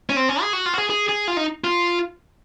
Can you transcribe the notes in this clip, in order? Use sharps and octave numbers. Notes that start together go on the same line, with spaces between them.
C#4
C4
C#4
G#4
F#4
F4
F#4
G#4
G#4
G#4
F4
D#4
F4